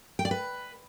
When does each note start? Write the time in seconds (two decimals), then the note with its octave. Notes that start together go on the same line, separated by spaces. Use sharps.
0.19 G5
0.25 D5
0.31 B4